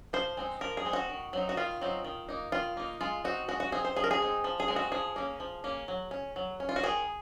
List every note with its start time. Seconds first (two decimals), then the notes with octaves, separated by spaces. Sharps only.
0.13 F3 C5
0.37 G#3 C4 D#4
0.61 F3 A#4
0.77 G#4
0.85 G#3 C4 D#4
0.93 F#4
1.09 D#3
1.33 F#3 C4 D#4
1.49 F#4
1.57 D#3 F4
1.81 F#3 C4 D#4
2.05 D#3
2.29 A#3 D#4
2.52 D#3 F4
2.77 A#3 D#4
3.01 G#3 F4
3.24 C4 D#4 F#4
3.48 G#3 F#4
3.60 F#4
3.72 C4 D#4 G#4
3.85 C5
3.96 F3 G#4
4.04 A#4
4.11 G#4
4.20 G#3 C4 D#4
4.44 F3
4.60 G#4
4.68 G#3 C4 D#4
4.76 F#4
4.92 F3 G#4
5.16 A#3 C#4
5.40 F3
5.64 A#3 C#4
5.88 F#3
6.11 C#4
6.36 F#3
6.60 C#4
6.69 F4
6.76 F#4
6.83 D#3 G#4